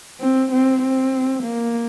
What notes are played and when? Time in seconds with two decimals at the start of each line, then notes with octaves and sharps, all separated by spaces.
0.21 C4
0.52 C4
0.82 C4
1.43 A#3